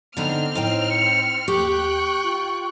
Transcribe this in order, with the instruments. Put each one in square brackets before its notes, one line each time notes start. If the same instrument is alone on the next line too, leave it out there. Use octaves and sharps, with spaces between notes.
[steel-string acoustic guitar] D3 D4 D#4 [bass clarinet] B3 [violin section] C4 F6
[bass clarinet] A2 [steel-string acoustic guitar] D#4 C5 G5
[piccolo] C#7
[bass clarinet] D#2 [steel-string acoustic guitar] G4 [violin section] G5 F#6 [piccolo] C#6
[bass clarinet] F4